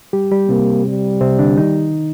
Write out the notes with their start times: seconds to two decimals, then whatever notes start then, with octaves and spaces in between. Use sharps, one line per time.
0.13 G3 G4
0.31 G3 G4
0.49 C3 A#3 C4
0.86 G3
1.21 C3 C4
1.39 D3 D4
1.57 D#3 D#4